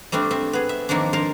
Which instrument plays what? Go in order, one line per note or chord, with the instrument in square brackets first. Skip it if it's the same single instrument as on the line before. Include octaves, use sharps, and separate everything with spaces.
[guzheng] G3 A3 C4 D4
C4 E5
B3 G#4
E5
D#3 F3 A#3 C4 D4
A#4 C5 F5 A5